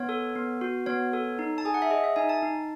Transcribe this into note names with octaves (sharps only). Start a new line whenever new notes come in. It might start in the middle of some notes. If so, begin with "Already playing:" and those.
Already playing: B3 C#5
A4
B3
F#4
B3 C#5
A4
D#4
A5
G#4 G#5
F#5
E5
G#4 D#5
E5
D#4 G#5
A5
D#4